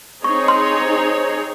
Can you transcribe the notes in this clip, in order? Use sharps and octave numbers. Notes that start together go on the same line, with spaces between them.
C4 D#4 G#4 C#5 C#6
C6